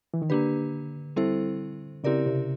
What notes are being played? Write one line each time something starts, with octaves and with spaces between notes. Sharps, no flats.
E3
D#3
D3 A#3 D4 G4 B4
G3 C4 E4 A4 C5
C#3 C4 E4 G4 A#4 D5
C3